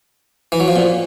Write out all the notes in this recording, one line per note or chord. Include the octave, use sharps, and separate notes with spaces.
E3
F#3
F3
A#2